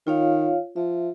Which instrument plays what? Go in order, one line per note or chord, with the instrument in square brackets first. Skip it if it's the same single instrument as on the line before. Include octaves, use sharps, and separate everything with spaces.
[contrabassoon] D#3 [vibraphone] F4 C#5 F5
[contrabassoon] F3 [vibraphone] E5